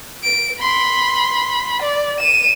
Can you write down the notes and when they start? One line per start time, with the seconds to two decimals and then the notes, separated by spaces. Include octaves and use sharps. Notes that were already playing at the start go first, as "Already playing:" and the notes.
0.23 D7
0.60 B5 C6
1.82 D5
2.19 D#7 E7